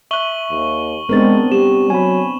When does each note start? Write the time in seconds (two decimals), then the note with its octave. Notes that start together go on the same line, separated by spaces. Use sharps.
0.11 E5 C#6 F#6 F#7 G7
0.51 D#2
1.09 G#3 B3 C4 D4 A#4 C5 A6
1.52 G3 G4 E7
1.90 F#3 G#5 B5